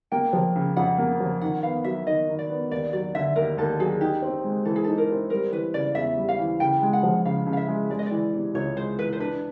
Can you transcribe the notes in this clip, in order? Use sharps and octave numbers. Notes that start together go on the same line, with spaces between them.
A#3 G5
F3
C#3
F2 F#5
A#3
F3
D#3 F#5
B3 F5
F#3 E5
D#3 D#5
D#3
D5
B3
D#2 D5
F#3 D5
D3 E5
D#2 A#4
D#2 A4
F#3 G#4
D#4 G4
C4
G#3
E3 A4
G#4
D#4 A4
A#4
C4
G3 A#4
E3 B4
C#3 D5
E2 E5
G3
F5
E3
C#3 G5
G#3
F#5
F3
C#3 F5
C#3
F5
E5
G#3
G#3 D5
D#5
D5
E3
C3
C#2 C#5
G#3 C5
E3 B4
C5
D4 B4